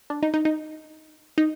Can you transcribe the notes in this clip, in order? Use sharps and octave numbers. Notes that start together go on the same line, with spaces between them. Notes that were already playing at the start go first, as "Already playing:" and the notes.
D4
D#4
D#4
D#4
D#4